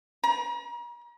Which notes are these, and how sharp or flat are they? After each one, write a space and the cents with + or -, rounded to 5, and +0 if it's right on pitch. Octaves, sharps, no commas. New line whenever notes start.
A#5 +40